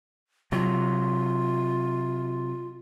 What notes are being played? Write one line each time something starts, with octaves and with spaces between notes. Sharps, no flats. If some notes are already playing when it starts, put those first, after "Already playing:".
C3 F#3 F4